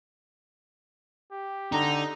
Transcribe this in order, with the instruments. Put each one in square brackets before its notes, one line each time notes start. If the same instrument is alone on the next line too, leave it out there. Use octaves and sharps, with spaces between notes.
[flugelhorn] G4
[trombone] D3 [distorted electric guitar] D#4 [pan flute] A#5